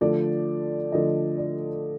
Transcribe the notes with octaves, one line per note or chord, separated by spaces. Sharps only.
D3 F3 A3 D5
D3 F3 A3 D#5
D5